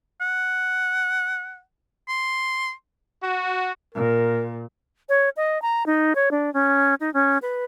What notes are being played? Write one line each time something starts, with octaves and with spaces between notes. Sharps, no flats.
F#5
C6
F#4
A#2 A#4
C#5
D#5
A#5
D#4
C#5
D4
C#4
D#4
C#4
B4